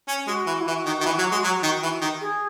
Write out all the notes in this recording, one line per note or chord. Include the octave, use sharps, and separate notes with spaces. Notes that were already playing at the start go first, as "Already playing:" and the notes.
C#4
G#3 F#4
E3
E4
E3 F#4
D#3
D#3
E3
F#3
G#3
F#3
D#3
E3
D#3
G#4